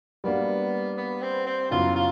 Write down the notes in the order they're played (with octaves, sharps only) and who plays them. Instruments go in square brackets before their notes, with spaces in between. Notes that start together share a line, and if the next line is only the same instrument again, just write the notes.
[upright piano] G3 A#3 D4 F#4 [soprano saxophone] B3
[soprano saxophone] B3
C4
C4
[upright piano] F#2 C#3 F#3 B3 E4 [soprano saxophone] F4
[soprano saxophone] F4